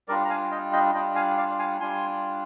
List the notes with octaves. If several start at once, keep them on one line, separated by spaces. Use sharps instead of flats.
G3 D4 F4 A#4 D5
A#5
F5 G#5
D#5 G5
D#5 G5
G3 D4 F4 D#5 G5
F5 G#5
D5 F5
F5 G#5
G3 D4 F4 G#5 C6